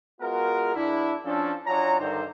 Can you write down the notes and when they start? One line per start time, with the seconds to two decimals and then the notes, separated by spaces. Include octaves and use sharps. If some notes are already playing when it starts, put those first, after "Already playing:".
0.21 G#3 B3 F4 F#4 G#4 A#4
0.75 E2 D4 E4
1.25 F3 C#4 D4 A4
1.67 F#3 C#4 D4 F4 C#5 A#5
2.00 G2 D3 D#3 C5